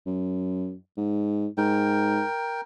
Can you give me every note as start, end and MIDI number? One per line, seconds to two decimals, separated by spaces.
0.06 0.74 42
0.97 1.47 44
1.58 2.22 44
1.58 2.61 70
1.58 2.61 79